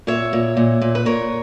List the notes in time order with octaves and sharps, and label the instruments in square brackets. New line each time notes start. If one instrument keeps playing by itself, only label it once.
[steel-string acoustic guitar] A#2 C#5 E5
A#2
A#2
A#2
B4
A#2 A#4 C#5